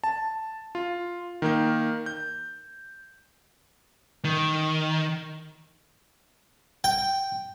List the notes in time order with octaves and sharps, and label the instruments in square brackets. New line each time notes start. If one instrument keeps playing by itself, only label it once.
[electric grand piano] A5
F4
D#3 A#3 G6
G6
[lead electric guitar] D#3
[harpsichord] G5